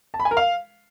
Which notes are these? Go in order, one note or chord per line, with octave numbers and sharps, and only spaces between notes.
A5
B5
G#5
A#4
F5